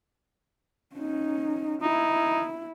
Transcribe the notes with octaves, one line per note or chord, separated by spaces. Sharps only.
C#4 D#4
D#4 E4